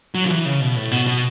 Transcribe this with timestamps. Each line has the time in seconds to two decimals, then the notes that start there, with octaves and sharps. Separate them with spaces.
0.15 F#3
0.24 D3
0.30 E3
0.46 C#3
0.61 B2
0.76 A2
0.91 B2
1.07 B2